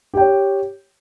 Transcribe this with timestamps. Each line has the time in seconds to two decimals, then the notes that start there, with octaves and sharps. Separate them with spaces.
0.14 G4
0.17 G5
0.21 C#5